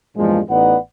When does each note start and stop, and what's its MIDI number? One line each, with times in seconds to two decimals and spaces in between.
0.17 0.40 40
0.17 0.40 43
0.17 0.40 46
0.17 0.40 53
0.17 0.40 56
0.50 0.76 33
0.50 0.76 59
0.50 0.76 63
0.50 0.76 71
0.50 0.76 74
0.50 0.76 78